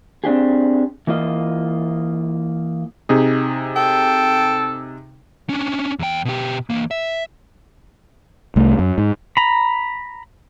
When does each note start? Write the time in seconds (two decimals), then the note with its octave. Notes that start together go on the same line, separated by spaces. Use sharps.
0.24 C4 D4 G4 G#4
1.07 E3 A#3 F4 D#5
3.09 C3 D#4 G#4
3.76 A4 G5
5.49 C#4 D4
5.99 E2 G5
6.25 B2 G4
6.70 E3 A#3
6.91 E5
8.56 C2 A3
8.79 F#2
8.98 G#2
9.37 A#5 B5